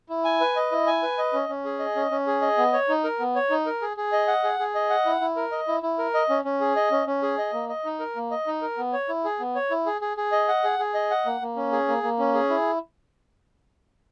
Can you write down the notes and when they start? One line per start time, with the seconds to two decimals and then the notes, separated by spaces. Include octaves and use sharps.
0.09 E4
0.25 G#5
0.41 B4
0.56 D#5
0.72 E4
0.87 G#5
1.03 B4
1.18 D#5
1.33 C#4
1.49 C#4
1.65 G#4
1.79 D#5
1.96 C#4
2.11 C#4
2.27 G#4
2.42 D#5
2.57 B3
2.73 C#5
2.89 D#4
3.04 A#4
3.19 B3
3.35 C#5
3.50 D#4
3.66 A#4
3.81 G#4
3.97 G#4
4.12 D#5
4.28 F#5
4.44 G#4
4.59 G#4
4.75 D#5
4.90 F#5
5.05 E4
5.21 E4
5.36 A#4
5.52 D#5
5.68 E4
5.83 E4
5.99 A#4
6.14 D#5
6.29 C#4
6.45 C#4
6.60 G#4
6.76 D#5
6.91 C#4
7.07 C#4
7.22 G#4
7.38 D#5
7.53 A#3
7.69 D#5
7.85 D#4
8.00 A#4
8.16 A#3
8.31 D#5
8.47 D#4
8.62 A#4
8.78 B3
8.93 C#5
9.09 E4
9.24 G#4
9.40 B3
9.55 C#5
9.70 E4
9.86 G#4
10.01 G#4
10.17 G#4
10.32 D#5
10.48 F#5
10.64 G#4
10.79 G#4
10.94 D#5
11.10 F#5
11.26 A#3
11.41 A#3
11.56 C#4
11.72 G#4
11.88 A#3
12.03 A#3
12.19 C#4
12.34 G#4
12.50 E4